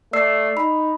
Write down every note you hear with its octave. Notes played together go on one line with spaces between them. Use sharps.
A3 D5 E6 C7
D#4 B5